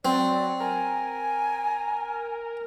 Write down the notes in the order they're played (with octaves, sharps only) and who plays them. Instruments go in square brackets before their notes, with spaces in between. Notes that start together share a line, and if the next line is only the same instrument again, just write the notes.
[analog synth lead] F#3 [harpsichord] C4 [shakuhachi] D5
[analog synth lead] A#4 [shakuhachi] G#5